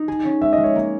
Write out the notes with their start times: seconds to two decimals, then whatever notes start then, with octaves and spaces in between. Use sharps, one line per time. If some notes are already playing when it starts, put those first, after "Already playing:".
Already playing: D#4
0.08 G#4
0.25 C#4
0.41 G#3 E5
0.53 D#5
0.58 G#3
0.64 C#5
0.75 A#3